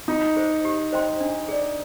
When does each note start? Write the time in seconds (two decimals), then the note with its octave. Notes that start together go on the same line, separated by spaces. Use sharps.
0.08 D#4 F4
0.36 G#4 C5
0.65 G4
0.93 C5 D#5 G5 C6
1.20 D4
1.48 G#4 D5